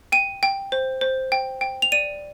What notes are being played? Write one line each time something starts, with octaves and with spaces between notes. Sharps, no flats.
G5 D#7
G5
C5
C5
G5
G5
F7
D5 D#7